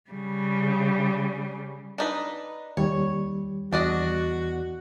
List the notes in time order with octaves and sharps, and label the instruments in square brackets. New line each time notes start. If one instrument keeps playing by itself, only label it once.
[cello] C#3 G3
[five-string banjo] D4 D#4 B4
[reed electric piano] D#2 G3 [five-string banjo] C#5
[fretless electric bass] E2 [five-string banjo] D4 D5 D#5 [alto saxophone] F#4